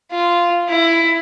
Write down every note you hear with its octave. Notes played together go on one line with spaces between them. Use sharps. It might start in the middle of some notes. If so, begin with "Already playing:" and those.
F4
E4